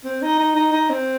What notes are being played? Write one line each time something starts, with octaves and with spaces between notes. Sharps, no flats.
C4
D#4
D#4
D#4
D#4
C4